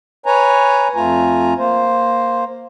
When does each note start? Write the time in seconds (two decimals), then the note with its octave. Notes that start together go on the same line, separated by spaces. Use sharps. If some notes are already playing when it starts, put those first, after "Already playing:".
0.26 B4 C#5 G#5 A#5
0.95 F2 A3 F4 G#5 A#5
1.58 A#3 C5